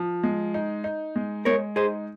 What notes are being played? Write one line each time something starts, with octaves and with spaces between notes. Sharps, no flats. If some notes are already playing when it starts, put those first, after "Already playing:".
Already playing: F3
G#3
D#4
D#4
G#3
G#3 A#4 C#5
D#4 G#4 C5